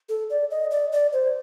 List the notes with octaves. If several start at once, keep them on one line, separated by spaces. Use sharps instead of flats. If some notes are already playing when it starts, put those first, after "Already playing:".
A4
D5
D#5
D5
D5
C5